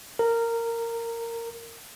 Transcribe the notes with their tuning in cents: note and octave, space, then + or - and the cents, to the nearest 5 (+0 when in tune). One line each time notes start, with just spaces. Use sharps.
A#4 -15